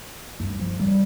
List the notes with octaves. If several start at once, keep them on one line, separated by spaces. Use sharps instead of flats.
G2
F3
G3